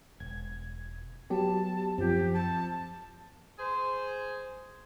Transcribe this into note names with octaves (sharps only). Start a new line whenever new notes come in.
E1 G#6
F#3 B3 G4 A5
F#2 F3 C4 G4
A5
G#4 C5